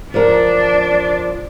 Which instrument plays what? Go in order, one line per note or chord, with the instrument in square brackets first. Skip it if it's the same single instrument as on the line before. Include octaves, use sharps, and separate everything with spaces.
[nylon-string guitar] F3 A#4 [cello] D4